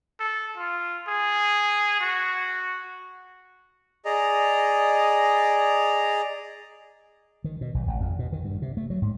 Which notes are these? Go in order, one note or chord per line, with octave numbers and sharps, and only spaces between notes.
A4
F4
G#4
F#4
G#4 D5 D#5 A#5
D#3
B2
B1
G#1
F2
B2
D#3
G2
C3
A3
F#3
G#2